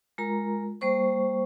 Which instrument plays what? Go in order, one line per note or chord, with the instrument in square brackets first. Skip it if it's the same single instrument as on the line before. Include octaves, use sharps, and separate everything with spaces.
[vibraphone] G#3 F4 A#4 A#5
G3 A#3 C5 C#6